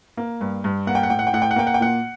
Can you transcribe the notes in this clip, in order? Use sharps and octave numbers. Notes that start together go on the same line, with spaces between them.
A#3
G2
G2
A#3 F#5
G5
F#5
A2 G5
F#5
G5
A2 F#5
G5
F#5
A#3 G5
F#5
G5
A#2 F#5